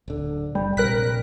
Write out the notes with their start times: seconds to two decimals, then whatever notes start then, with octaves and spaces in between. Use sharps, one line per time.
0.08 D1 D3
0.55 F#1 G3
0.77 A#1 C3 A#4 F#6 B6